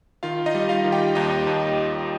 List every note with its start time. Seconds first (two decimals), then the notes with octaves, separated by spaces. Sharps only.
0.23 D#3 F4 F5
0.46 D#4 D#5
0.55 G3
0.69 F4 F5
0.84 D#3
0.92 G4 G5
1.15 D#2 D#4 D#5
1.47 D#2